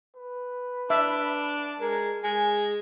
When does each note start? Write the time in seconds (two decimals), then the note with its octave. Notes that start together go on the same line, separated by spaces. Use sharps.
0.16 B4
0.90 D4 E5
1.80 G#3 A#4
2.24 G#3 G#5